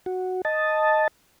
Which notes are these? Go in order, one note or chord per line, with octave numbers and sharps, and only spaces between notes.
F#4
D#5 A5